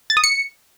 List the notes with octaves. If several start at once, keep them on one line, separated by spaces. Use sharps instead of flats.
A6
D#6
C#7